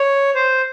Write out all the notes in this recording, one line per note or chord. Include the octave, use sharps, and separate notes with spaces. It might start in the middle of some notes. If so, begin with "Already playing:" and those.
Already playing: C#5
C5